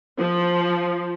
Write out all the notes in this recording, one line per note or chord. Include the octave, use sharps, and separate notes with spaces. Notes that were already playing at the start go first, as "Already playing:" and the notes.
F3